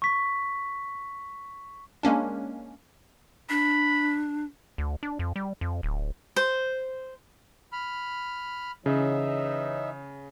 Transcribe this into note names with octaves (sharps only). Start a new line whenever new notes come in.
C#6 B6
G#3 A#3 C#4 D4
D4 B5
D2
D4
F2
G3
F2
D1
C5
B5 F6
C#3 E3 C#4 D#4 C#5 E5